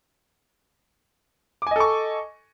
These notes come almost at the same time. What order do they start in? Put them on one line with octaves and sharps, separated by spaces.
D6 G#5 D#5 A4 C#6